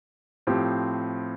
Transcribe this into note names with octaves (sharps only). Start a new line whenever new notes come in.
A2 F3 C4 G4